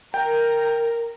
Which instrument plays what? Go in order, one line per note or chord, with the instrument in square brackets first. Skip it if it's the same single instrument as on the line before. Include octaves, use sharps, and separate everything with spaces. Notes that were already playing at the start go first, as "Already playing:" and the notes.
[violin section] A#4 [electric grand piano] G5